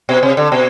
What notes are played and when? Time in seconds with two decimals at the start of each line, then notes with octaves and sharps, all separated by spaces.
0.09 B2
0.23 C3
0.37 D3
0.52 B2